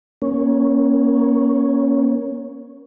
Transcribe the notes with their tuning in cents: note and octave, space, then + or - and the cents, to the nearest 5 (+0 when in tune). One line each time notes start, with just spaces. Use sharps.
A#3 +25 C#4 +0